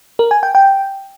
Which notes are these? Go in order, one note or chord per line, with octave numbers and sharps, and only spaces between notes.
A#4
G#5
G5
G5